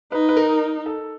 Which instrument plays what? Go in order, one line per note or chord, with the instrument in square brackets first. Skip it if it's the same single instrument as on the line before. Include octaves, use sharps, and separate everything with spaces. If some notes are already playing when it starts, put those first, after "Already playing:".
[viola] D#4 [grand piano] B4
[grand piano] B4
A#4
A4